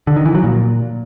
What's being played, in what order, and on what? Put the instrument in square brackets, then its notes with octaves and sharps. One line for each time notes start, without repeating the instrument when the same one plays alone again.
[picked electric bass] D3
D#3
E3
F#3
A#2